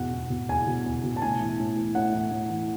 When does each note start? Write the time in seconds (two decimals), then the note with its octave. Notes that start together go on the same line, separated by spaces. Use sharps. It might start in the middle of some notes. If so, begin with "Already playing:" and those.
Already playing: E2 B2 F#5
0.13 E2
0.30 B2
0.49 E2 G#5
0.67 B2
0.86 E2
1.04 B2
1.16 A5
1.22 A2 G#5
1.41 E3
1.59 A2
1.77 E3
1.95 A2 F#5
2.14 E3
2.31 A2
2.50 E3